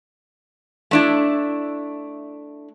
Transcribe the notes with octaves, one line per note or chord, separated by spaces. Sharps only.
A3 D4 E4